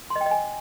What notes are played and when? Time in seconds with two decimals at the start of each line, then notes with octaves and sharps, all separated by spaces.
0.10 C6
0.16 D#5
0.21 G5
0.26 D#5
0.31 G#5